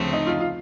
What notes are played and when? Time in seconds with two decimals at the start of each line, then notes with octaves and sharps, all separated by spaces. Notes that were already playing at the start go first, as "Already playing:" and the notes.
Already playing: D2 C#3 F3 A3 C4
0.13 D#4
0.27 F4
0.40 F4